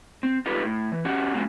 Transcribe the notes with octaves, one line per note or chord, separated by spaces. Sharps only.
C4
D#4 F4 G4 A4 B4
A2
E3
C#4 F#4 G4 F#5
F#3 G#3 A#3 C#4 F#4